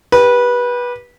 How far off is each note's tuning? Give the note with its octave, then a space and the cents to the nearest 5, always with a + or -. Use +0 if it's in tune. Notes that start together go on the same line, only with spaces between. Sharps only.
G4 +10 B4 -20